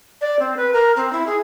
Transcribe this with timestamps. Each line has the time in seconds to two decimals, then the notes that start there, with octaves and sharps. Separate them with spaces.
0.21 D5
0.39 C4
0.57 B4
0.73 A#4
0.96 C4
1.13 E4
1.27 G#4